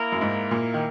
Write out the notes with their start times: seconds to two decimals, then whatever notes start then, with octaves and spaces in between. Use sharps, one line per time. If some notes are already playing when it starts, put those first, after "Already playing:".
Already playing: A#3 E4 A#4
0.12 F#2
0.21 G#2
0.51 A#2
0.74 D#3